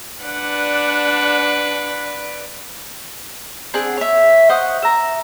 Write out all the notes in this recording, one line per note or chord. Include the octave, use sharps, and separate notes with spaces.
D4 B4 D5 F#5
C4 D4 G#4 F#5
C#5 E5
C5 D#5 F#5 C#6
E5 A#5